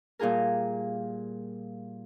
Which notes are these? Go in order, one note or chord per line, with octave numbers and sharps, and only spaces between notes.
A#2 G3 F4 G#4 A#4